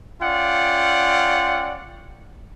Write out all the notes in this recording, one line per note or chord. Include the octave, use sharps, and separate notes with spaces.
C#4 F4 D5 F#5 G5